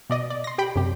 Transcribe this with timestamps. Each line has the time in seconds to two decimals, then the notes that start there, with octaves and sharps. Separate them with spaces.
0.10 B2 D5 D#5
0.30 D5
0.44 C6 A#6
0.58 G4 G5 B5
0.76 F#2 C3 G4